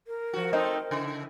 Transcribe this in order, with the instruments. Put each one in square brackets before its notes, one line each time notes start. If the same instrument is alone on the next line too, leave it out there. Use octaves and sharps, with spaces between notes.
[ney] A#4
[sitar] F3 F#4
[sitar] A3 C4 D#4 [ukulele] C5 D#5
[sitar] C#3 E4